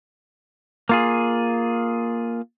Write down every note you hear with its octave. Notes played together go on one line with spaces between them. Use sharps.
A#3 F4 G#4